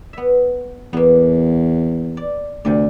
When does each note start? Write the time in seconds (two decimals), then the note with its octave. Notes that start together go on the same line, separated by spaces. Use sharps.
0.13 B3 E5
0.93 E2 A#3 B3
2.17 D5
2.65 D2 C3 D5